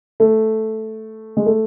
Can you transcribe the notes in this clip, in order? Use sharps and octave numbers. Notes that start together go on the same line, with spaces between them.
A3
G#3
A3